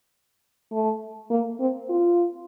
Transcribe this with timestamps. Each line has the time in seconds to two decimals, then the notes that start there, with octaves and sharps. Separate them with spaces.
0.72 A3
1.31 A#3
1.60 C4
1.89 F4